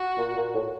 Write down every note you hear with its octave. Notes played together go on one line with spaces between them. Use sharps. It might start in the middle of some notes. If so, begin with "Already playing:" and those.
Already playing: F#4
A#2
A#2
A2